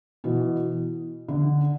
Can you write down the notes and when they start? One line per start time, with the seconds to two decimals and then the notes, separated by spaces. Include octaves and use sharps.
0.24 B2 E3
1.28 D3